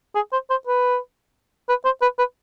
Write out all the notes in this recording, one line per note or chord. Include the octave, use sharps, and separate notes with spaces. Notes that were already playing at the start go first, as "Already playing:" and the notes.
G#4
C5
C5
B4
B4
C5
B4
B4